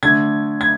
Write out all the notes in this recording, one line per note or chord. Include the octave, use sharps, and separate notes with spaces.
D3 A3 D4 G#6
G#6